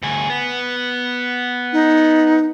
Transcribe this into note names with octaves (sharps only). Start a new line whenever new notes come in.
D2 G#4
B3
D#4